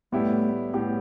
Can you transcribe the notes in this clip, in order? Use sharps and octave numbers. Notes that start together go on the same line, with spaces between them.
A2 G3 A3 B3 E4 G4
A2 G3 B3 E4 G4